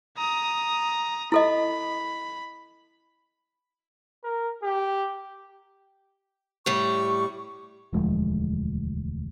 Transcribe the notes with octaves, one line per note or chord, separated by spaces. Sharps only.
A#5 D#6
E4 A4 D#5 B5
A#4
G4
A2 G3 C#6
E1 D2 F3 G#3